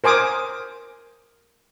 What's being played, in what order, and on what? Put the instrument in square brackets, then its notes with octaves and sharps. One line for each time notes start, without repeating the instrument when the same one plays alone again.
[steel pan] A#4 C5 G#5 D6 D#6